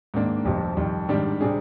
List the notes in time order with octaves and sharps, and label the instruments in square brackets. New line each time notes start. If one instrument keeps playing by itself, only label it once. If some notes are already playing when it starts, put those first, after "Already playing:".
[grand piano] G#2 D#3 A#3 D4
G1 F2 C3 F3
F2 D#3 G3
G#2 D#3 G3 D4 G4
C3 G3 D4 G#4